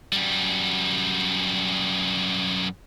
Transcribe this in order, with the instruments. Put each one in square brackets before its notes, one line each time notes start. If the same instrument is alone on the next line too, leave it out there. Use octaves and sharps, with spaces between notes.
[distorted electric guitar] F#2 G3